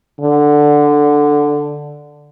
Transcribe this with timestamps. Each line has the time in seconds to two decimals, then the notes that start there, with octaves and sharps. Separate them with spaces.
0.20 D3